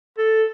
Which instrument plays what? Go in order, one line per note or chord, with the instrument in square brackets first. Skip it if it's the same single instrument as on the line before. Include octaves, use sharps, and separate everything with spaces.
[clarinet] A4